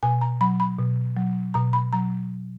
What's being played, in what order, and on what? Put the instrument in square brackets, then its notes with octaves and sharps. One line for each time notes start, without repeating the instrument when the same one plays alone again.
[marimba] B2 G#5
A#5
F#3 B5
B5
B2
F#3
B2 A#5
B5
F#3 A#5